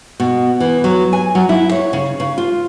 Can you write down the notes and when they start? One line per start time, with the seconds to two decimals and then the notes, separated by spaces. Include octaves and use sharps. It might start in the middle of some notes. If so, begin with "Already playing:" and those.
0.20 B2
0.60 E3
0.84 F#3
1.13 G#5
1.35 F#3
1.49 E4
1.72 C#5
1.93 C#3
2.20 C#3
2.38 F4